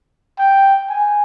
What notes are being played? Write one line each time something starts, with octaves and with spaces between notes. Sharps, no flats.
G5
G#5